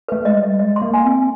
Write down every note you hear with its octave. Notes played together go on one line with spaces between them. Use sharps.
A3 B4
G#3 D#5
G3
D#5
G#3 D#5
C6
A#3
G#5
C4
G#5